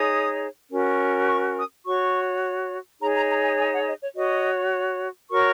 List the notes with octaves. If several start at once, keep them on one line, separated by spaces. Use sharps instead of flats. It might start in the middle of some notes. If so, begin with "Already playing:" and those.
Already playing: D#4 G#4 C#5 D#6
C#4 F#4 A#4
C#6
D#6
F#4 C#5 C#6
D#4 G#4 C#5 A#5
A#5
A#5
G#5
G#5
F#5
D#5
C#5
F#4 C#5 D#5
F#4 A#4 C#5 C#6